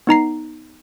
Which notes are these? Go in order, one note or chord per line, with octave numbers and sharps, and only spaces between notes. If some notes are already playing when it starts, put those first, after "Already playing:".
B3 D#4 A#5 C7